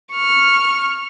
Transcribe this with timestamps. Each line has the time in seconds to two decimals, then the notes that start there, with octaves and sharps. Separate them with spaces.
0.11 C#6 F6